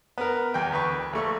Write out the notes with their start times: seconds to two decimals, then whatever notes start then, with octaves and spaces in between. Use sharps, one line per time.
0.18 B3 A#4
0.54 E2 G5
0.72 D2 B4 C#6
1.13 A#1 A3 C#6